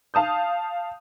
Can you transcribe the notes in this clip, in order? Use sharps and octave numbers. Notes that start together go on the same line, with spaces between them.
F5 A5 D#6 G6